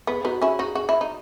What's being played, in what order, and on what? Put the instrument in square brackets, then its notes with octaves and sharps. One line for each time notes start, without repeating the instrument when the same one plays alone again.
[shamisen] B3 [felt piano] G#4
[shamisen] B3 D#4 [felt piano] F#4
[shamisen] C#4 E4 [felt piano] G#4
[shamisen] D#4 F#4 [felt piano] G#4
[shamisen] F#4 [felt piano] G#4
[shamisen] E4
D#4